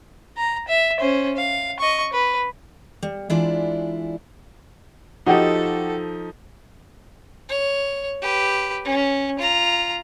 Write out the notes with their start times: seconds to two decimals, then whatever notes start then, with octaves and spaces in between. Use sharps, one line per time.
0.38 A#5
0.68 E5
1.00 C#4 C5
1.37 F5
1.80 D#5 C#6
2.13 B4
3.03 G3
3.30 E3 G#3 D4 E4 F4 D5
5.26 F3 D#4 F#4 G4 A4 D#5
7.49 C#5
8.22 G4 B4
8.85 C#4
9.39 F4 A#5